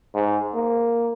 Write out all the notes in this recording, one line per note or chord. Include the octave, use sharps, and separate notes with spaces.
G#2
A#3